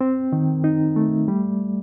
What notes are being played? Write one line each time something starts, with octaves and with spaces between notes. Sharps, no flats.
C4
D#3
D#4
A3
G3